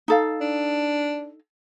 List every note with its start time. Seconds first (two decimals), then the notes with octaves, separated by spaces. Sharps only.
0.08 D#4 A4 F5
0.41 D4